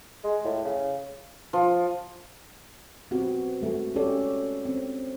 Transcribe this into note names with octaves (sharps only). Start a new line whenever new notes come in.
G#3
A2
C#3
F3
B3 C4 F#4 G4
G#3 A3 F#4
C#4 G4 A4 C#5 D5
C4